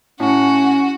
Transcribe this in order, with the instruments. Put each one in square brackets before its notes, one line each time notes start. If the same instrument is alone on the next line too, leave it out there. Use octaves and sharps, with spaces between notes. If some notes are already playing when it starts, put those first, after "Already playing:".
[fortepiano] A2 [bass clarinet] C#4 [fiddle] F#4 [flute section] F#5